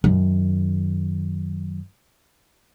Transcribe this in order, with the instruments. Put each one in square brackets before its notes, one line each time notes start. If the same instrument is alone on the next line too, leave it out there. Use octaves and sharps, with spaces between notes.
[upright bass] F#2 D#3